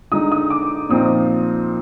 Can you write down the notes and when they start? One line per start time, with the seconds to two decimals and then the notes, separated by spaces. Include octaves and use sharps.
0.12 D3 G#3 D#4 D#6
0.32 D#6
0.50 D6
0.89 A#2 F3 C4 D#4 D#6